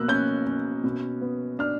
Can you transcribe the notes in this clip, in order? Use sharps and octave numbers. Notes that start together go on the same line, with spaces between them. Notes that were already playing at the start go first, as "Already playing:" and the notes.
Already playing: B2 A#3 E6 F#6
C#4 G6
C#4
B2
B3
D4 F6